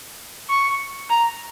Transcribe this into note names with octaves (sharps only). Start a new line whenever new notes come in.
C#6
A#5